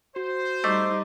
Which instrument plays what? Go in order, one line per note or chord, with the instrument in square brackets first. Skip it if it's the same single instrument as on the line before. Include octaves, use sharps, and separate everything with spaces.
[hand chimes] F#4 [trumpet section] C5
[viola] G3 D#4 [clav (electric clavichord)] A3 [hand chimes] D#5 D6 C7